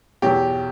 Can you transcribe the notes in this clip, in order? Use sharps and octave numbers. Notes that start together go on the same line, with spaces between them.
E2 B2 F#3 G4